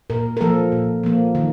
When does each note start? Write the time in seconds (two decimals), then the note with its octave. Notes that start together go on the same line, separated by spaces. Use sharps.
0.10 A#2 A#4
0.37 A#4
0.41 F3 A#3 A4
0.72 A#2
1.04 F3 A#3
1.35 D#3